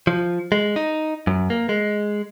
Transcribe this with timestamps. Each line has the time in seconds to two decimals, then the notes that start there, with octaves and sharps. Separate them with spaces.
0.07 F3
0.52 G#3
0.76 D#4
1.27 F#2
1.50 A#3
1.69 G#3